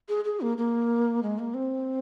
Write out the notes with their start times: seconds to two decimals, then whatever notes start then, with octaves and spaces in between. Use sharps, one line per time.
0.09 G#4
0.25 G#4
0.41 A#3
0.58 A#3
1.23 G#3
1.39 A#3
1.54 C4